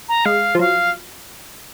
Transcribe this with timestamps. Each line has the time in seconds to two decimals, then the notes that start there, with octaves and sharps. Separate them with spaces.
0.09 A#5
0.25 G#3 F5
0.55 F3
0.59 F#3 F5